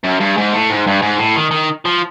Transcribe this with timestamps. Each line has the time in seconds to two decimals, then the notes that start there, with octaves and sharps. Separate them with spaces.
0.04 F#2
0.20 G2
0.37 G#2
0.53 A2
0.70 G#2
0.87 G2
1.02 G#2
1.19 A2
1.36 D#3
1.51 D#3
1.85 F3